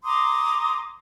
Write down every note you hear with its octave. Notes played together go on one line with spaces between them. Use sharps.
A#5 C6 D6 D#6